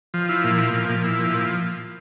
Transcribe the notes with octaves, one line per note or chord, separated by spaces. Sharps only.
F3
E4
A#2
F3
A#2
A#2
E4
F3
A#2